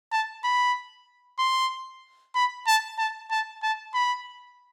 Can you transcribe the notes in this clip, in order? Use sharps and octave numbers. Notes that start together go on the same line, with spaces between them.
A5
B5
C6
B5
A5
A5
A5
A5
B5